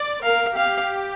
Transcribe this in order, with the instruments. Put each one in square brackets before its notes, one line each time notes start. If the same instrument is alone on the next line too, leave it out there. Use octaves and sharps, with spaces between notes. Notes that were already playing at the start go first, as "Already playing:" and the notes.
Already playing: [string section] D5
[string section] A#4 [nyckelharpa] F5
[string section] G4 [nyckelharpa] F5